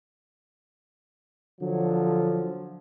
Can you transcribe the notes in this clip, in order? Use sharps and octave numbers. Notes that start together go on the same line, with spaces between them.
D3 F3 F#3